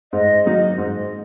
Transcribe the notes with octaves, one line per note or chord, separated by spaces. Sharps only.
G#2 D#5
D#3 F#3 A#3 D#4
G#2